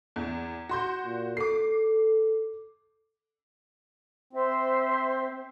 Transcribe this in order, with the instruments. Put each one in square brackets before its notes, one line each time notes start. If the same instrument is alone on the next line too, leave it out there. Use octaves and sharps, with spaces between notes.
[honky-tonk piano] E2
F#4 C6 G6
[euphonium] A#2
[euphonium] A4 [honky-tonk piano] D6 C7
[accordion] C4 [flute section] C5 E5